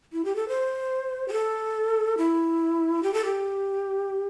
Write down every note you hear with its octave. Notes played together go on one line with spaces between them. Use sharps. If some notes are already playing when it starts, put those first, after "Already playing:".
E4
G4
A4
C5
G4
A4
E4
G4
A4
G4